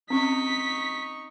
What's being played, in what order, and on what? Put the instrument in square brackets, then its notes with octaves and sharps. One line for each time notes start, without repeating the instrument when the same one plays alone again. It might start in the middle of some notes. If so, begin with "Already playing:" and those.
[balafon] C4 C#4 [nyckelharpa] D#4 C#6 [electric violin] B6